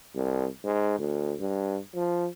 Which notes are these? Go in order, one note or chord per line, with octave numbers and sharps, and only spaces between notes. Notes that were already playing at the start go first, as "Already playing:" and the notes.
C2
G#2
D2
G2
F3